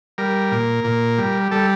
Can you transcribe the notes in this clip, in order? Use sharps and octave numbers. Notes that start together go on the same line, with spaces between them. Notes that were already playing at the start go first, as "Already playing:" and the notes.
G3 A#4
A#2
A#2
G3
G3 A4